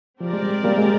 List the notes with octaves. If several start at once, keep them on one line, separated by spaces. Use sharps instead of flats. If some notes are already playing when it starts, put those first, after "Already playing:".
F3 C4 G4 A#4 D5
G#3
G3
G3 A#3
G#3